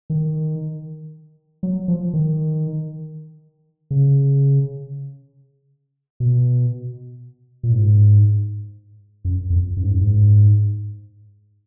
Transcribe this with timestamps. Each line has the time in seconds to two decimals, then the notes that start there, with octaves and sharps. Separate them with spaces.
0.10 D#3
1.63 F#3
1.88 F3
2.13 D#3
3.91 C#3
6.20 B2
7.63 A#2
7.73 G#2
9.25 F#2
9.50 F2
9.77 F#2
9.83 G#2
9.90 F#2
10.01 G#2